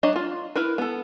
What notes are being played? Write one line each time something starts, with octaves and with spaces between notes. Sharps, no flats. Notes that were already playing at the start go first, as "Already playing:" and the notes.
F#3 D4 C#5 D#5 A#5
F4
E4 A#4 B4
B3 A4